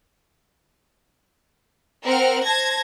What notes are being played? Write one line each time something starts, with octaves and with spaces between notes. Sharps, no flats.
C4 A#4 F#5 F6
C5 A5 G#6 A#6